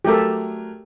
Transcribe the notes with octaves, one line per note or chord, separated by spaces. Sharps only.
F#3 A3 G4 A4 A#4